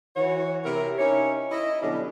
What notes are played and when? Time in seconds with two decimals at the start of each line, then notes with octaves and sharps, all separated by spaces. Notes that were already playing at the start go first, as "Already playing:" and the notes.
0.15 E3 F#4 C#5
0.64 C3 E4 A#4
0.98 C#4 D#4 E4 G4 C#5
1.50 E4 D#5
1.81 B2 D3 F#3 G3 C#4 D4